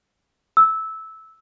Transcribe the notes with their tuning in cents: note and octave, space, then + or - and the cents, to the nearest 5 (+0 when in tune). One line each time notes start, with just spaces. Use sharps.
E6 -15